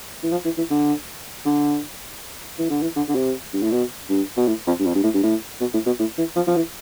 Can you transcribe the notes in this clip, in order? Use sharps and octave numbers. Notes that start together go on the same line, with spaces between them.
E3
F3
E3
E3
D3
D3
E3
D3
E3
D3
D3
C3
G2
A2
B2
G2
B2
A2
F2
G2
F2
G2
A2
G2
A2
B2
A2
B2
A2
E3
F3
F3
E3